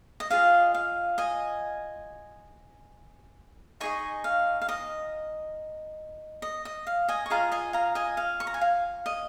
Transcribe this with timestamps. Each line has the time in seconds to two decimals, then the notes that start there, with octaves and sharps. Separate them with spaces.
0.20 D#5
0.30 F4 G#4 D#5 F5
0.74 F5
1.18 D#5 G#5
3.80 D#4 G#4 D#5 G#5 C#6
4.24 F5
4.61 F5
4.69 D#5
6.42 D#5
6.65 D#5
6.87 F5
7.08 D#5 G#5
7.26 C#6
7.30 F4 G#4 D#5 F5 A#5
7.52 D#5 G#5
7.73 F5 A#5
7.95 D#5 G#5
8.17 F5
8.40 C#6
8.47 A#5
8.54 G#5
8.61 F5
9.06 D#5